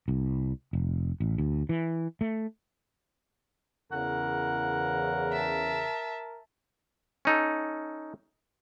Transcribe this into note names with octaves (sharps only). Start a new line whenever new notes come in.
C2
F1
A1
D2
E3
A3
E2 C#3 A#4 F#5
E5 A5
C#4 D#4 A4